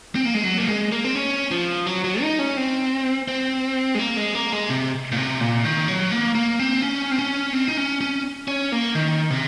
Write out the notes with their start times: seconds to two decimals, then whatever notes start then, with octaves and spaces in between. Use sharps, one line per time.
0.15 C4
0.25 A#3
0.34 G#3
0.44 F#3
0.58 A#3
0.68 G#3
0.92 A#3
1.04 C4
1.15 C#4
1.51 F3
1.86 F#3
2.04 F#3
2.21 D#4
2.39 C#4
2.57 C4
3.28 C4
3.95 G#3
3.99 A#3
4.17 G#3
4.34 A#3
4.52 G#3
4.70 C3
5.12 A#2
5.17 C3
5.41 A#2
5.65 D#3
5.88 F#3
6.11 A#3
6.35 A#3
6.59 C4
6.82 C#4
7.11 C4
7.19 C#4
7.53 C4
7.68 D#4
7.77 C#4
8.01 C#4
8.48 C#4
8.72 A#3
8.95 D#3
9.30 C3